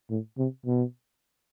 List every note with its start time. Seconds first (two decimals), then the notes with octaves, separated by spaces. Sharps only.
0.10 A2
0.38 C3
0.66 B2